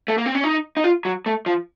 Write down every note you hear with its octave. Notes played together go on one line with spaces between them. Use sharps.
A3
A#3
C4
C#4
D#4
D#4
F4
F#3
A3
F3